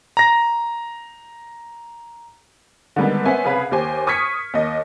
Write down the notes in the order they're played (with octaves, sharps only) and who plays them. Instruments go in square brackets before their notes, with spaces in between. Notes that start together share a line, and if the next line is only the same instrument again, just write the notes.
[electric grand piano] A#5 A#6
[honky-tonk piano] D3 D#3 G3 G#3 B3
B3 C#4 C5 C#5 E5 G#5
C2 C#3 G#4 B4 F5 B5
D#2 G4 C5 G#5
C#6 D#6 F6 G#6 B6 C#7
D#2 D#5